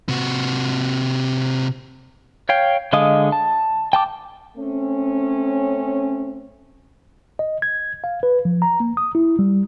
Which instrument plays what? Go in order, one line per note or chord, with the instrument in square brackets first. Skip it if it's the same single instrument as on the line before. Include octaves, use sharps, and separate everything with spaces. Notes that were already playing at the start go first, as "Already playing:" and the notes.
[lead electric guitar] C3 F#4
[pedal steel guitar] C#5 F5 G5
D3 G#3 D#5 F5 D#6
A5
G5 A5 D6
[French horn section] A3 C4 C#4
[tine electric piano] D#5
G#6
F5
B4
F3
A#5
A#3
D#6
E4
G3